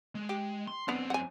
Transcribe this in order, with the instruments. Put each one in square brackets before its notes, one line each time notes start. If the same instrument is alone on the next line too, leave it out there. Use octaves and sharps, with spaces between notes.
[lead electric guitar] G#3
[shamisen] G4
[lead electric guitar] C6
[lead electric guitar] F#2 C4 [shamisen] B3 D4
[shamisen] F#5 G#5